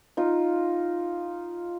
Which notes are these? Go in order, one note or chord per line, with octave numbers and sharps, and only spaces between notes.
D#4 F4